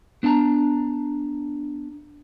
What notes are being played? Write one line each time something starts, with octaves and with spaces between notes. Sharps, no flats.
B3 D4 F#5 A5 A#5